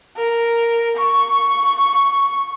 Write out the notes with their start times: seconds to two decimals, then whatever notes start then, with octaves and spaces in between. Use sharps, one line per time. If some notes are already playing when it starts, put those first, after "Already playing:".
0.17 A#4
0.96 C#6